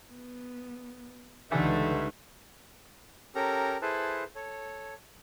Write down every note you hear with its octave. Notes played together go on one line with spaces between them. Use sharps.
B3
C#2 G2 D3 E3 A3 D#4 B4
C#4 G4 A4 A#4 A#5
E4 G#4 A4 B4 C5 A5
A4 C#5